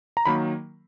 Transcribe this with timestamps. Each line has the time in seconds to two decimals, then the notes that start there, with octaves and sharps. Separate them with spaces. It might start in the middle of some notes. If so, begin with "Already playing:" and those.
0.17 A#5
0.25 D#3 F#3 A#3 B5